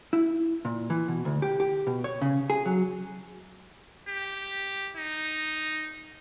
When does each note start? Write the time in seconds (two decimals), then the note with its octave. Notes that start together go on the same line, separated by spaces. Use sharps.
0.13 E4
0.65 A#2
0.90 E3
1.08 B2
1.25 D2
1.42 G4
1.60 G4
1.87 B2
2.04 C#5
2.22 C#3
2.50 G#4
2.66 F#3
4.09 G4
4.97 D#4